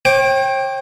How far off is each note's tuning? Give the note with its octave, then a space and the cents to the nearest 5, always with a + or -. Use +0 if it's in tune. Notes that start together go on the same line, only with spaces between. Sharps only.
C#5 -45 G5 +0 D6 +0